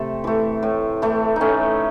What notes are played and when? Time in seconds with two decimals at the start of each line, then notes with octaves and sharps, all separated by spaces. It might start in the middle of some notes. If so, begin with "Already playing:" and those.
Already playing: C3 A3 A4 C5
0.24 E3 A3
0.63 A2
1.02 E3 A3
1.36 A2 C#4 D#4